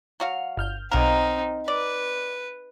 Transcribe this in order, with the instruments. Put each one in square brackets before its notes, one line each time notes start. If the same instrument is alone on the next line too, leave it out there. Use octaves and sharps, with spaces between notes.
[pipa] F#3 F#4 F5
[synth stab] G1 F6 G6
[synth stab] B1 F5 [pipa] F#3 A#4 [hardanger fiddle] C4 D#4
[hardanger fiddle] B4 [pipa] D5